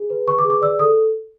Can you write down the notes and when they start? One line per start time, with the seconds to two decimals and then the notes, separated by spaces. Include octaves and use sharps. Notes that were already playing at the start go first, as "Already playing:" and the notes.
Already playing: G#4
0.10 B4
0.27 B4 C#6
0.39 D6
0.44 G#4
0.50 D6
0.62 D5 E6
0.79 A4 D#6